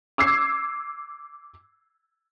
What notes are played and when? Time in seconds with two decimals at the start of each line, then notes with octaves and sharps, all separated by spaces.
0.18 D6 E6 G#6 C7